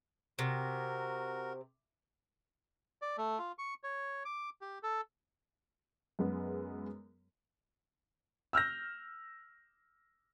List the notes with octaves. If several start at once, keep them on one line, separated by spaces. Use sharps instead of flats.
C3 F#4 A#4
D5
A3
F4
C#6
C#5
D6
G4
A4
F#2 G#3 B3
E6 F6 G6 A#6